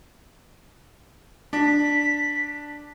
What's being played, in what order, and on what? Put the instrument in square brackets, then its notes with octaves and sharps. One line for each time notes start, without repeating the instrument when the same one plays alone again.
[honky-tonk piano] D4 [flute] B6